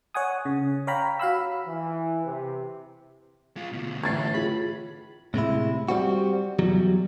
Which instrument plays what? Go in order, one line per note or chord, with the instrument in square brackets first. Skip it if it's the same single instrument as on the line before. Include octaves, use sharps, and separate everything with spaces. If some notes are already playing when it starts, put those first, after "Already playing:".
[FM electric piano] C#5 F#5 G#5 D#6
C#3
C#5 F5 G5 A#5 B5
F#4 F5 B5 E6
[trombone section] E3
C3
[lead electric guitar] G#3 F4
D2 B2
[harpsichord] A1 A2 [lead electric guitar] D3 [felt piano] G#6 A6 C7
[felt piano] F4 G#4 [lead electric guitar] B5
[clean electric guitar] A2 C3 G#3 E4
G3 C4 F#4
E2 F#3 G3